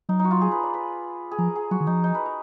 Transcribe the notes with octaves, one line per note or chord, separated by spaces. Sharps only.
F#3 D#4
D#4
F#4
F4
G#4
B4
D5
B4
G#4
F3 A#4
G#4
F#3 F#4
D#3
F3 D#4
D#4
B4
A#4